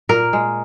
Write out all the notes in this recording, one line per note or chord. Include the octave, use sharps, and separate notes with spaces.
A#2 A#4
G#3